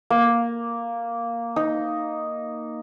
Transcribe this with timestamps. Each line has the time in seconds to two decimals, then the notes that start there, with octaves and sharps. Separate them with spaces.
0.10 A#3
1.56 D#4